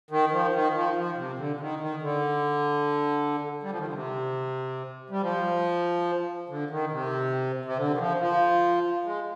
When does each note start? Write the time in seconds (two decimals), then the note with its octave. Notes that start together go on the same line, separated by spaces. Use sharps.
0.11 D#3
0.32 F3
0.53 D#3
0.75 F3
0.96 F3
1.17 C3
1.38 D3
1.56 D3
1.60 D#3
1.81 D#3
2.02 D3
3.63 G3
3.71 F3
3.79 D#3
3.86 D3
3.93 C3
5.10 G3
5.22 F3
6.50 D3
6.70 D#3
6.92 C3
7.65 C3
7.77 D3
7.94 D#3
7.98 F3
8.20 F3
9.05 G#3